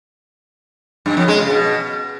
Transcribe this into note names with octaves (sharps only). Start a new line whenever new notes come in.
G2
F2
G#3
C#3
B2